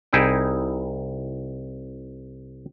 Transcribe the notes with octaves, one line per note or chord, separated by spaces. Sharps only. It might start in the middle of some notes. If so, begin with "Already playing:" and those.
C2 D#4 E4 G#4 G5